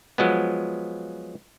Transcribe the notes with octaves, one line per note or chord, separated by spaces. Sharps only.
F3 F#3 G#3 B3